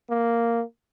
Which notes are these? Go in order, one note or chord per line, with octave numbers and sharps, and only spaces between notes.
A#3